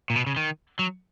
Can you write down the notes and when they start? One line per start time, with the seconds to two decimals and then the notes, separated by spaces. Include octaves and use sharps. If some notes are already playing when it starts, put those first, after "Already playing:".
0.10 A#2
0.16 B2
0.27 C#3
0.36 D#3
0.79 F#3